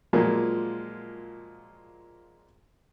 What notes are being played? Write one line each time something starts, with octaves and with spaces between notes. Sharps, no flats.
A#2 F3 F#3 G#3 A#3